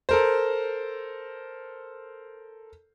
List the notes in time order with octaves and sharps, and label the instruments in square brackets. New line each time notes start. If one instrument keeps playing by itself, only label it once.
[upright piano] A4 A#4 C5